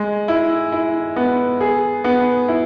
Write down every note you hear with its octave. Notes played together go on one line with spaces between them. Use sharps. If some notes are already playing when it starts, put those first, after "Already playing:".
Already playing: G#3
E4
E4
B3
G#4
B3
E4